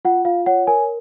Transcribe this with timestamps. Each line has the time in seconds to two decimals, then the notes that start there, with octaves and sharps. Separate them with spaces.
0.05 F4 F#5
0.25 F4 F5
0.46 C#5 F#5
0.67 A#4 G#5